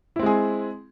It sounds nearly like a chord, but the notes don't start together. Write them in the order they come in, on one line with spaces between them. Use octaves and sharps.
E4 C4 G#3 G#4